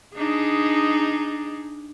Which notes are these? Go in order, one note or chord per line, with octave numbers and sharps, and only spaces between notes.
D4 D#4 G#4